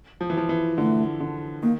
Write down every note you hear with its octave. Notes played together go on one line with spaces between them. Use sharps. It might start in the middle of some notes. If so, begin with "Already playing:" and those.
F3
E3
F3
E3
D3 A3
D3
D#3 A#3